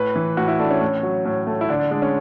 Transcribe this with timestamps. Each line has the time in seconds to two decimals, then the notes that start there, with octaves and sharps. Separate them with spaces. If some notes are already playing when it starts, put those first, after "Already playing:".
Already playing: A2 B4
0.16 E3
0.37 A2 F#4
0.48 E4
0.59 A3 D4
0.70 C#4
0.81 A2
1.03 F#3
1.25 A2
1.47 A3
1.61 E4
1.69 D3 D4
1.80 D4
1.91 G#3 D4
2.02 C#4